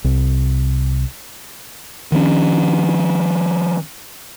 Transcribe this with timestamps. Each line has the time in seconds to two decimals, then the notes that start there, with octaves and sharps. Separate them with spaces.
0.04 C2
2.12 D#3 F3 A3 C#4